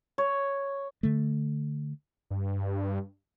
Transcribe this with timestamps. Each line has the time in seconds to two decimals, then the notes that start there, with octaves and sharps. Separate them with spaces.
0.18 C#5
1.03 D3 A3
2.31 G2